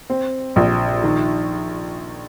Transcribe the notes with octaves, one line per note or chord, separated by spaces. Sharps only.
C4
A#1
D#3